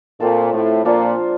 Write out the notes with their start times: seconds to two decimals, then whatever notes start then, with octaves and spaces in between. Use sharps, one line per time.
0.20 A#2 A3 C4 F4 A4
0.53 A2
0.85 A#2 F3 A#3 D4 F4